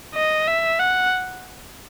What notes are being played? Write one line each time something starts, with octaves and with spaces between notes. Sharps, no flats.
D#5
E5
F#5